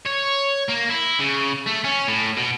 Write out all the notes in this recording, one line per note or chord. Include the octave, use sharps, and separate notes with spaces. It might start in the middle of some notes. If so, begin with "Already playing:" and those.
C#5
A#3
E4
C#3
A3
C#4
A2
B2